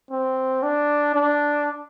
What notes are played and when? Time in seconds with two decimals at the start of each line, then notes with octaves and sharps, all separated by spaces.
0.11 C4
0.63 D4
1.15 D4